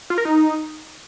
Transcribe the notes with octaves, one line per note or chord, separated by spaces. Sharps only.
F4
A#4
D#4